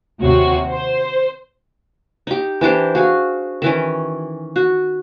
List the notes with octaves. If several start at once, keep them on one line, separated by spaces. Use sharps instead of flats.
D#2 C3 F#4 C#5
C5
D#4 G4
E3 D4 G4 C5
F#4 G#4 F5
D#3 E3 C#4
F#4